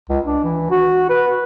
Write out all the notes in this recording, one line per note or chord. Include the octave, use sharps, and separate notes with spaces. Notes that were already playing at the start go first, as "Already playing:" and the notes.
C#2
D4
E3
F#4
B4